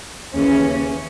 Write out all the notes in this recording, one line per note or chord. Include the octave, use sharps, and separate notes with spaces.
D#2 C#3 E3 C#4